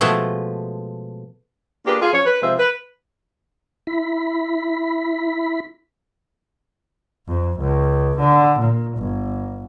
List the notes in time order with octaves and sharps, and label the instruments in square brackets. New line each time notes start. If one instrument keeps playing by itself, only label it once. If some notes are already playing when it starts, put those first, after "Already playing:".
[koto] B2 F3 G#3 A3
[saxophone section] A#3 D4 F4 G4 G#4 B4
F4 G#4
F3 C#4 C#5
B4
C3 F3 G#3 C4 C5 E5
B4
[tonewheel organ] E4 B5
[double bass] F2
C#2
D3
A#2
G1